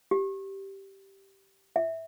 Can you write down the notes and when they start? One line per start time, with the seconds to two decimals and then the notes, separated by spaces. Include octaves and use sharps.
0.11 G4
1.76 E5